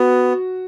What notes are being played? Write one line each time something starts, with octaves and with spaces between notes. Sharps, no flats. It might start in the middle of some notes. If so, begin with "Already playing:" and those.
Already playing: B3 F#4